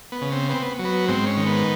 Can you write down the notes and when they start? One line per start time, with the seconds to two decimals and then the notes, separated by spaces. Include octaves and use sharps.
0.12 B3
0.21 C#3
0.32 C4
0.50 B3 C4
0.62 B3
0.79 F#3
0.85 B3
1.08 G#2 C4
1.27 C#4
1.37 D#3
1.46 B3